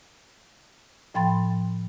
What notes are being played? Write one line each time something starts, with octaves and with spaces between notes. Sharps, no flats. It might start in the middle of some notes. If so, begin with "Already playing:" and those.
A2 F3 G5 B5 C6 A6